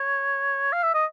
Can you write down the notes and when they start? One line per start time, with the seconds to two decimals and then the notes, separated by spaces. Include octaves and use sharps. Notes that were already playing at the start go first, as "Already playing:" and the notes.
Already playing: C#5
0.72 F5
0.83 E5
0.94 D#5